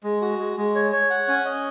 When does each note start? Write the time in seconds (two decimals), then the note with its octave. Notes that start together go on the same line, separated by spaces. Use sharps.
0.03 G#3
0.22 F#4
0.39 G#3
0.57 G#3
0.75 C#5
0.92 C#5
1.10 F#5
1.28 C#4
1.45 D#5